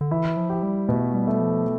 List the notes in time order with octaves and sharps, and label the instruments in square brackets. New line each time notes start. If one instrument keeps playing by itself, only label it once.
[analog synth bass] D3
[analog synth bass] E3 [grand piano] E4
[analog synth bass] F3
[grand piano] G4
[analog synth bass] G3
[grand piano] B2 [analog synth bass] A3
[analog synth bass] G3
[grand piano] A3
[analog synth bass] F3